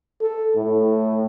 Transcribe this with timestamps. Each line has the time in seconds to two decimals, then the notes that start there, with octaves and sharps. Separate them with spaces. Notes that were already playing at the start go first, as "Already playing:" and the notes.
0.21 A4
0.57 A2